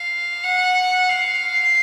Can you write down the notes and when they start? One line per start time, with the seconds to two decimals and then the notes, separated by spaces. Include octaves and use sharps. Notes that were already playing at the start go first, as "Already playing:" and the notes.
Already playing: F5
0.43 F#5
1.09 F5